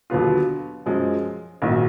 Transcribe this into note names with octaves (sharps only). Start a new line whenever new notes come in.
D#2 D3 F#3 B3 F4
F#2 F3 G#3
A#1 G#2 D#3 F#3 A#3